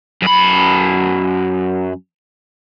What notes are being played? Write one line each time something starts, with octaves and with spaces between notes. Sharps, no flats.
F#2 B5